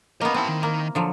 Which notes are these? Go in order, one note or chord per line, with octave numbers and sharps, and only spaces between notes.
A#3 B3 C#4 D#5
C4 E4 B4 A5
D#3
A#3
D3 F3 F#3